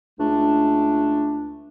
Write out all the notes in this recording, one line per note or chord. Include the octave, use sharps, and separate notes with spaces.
C#2 A3 D4